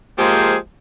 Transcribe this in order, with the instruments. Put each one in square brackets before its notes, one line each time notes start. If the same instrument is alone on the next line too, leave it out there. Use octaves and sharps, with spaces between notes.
[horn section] F3 G#3 A#3 G4 G#4 C5